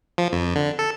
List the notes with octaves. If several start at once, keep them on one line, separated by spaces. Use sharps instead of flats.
F3
F2
D3
A4